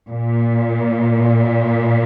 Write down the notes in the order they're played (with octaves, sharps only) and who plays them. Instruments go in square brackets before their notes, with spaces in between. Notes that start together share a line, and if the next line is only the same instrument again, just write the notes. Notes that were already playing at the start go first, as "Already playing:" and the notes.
[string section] A#2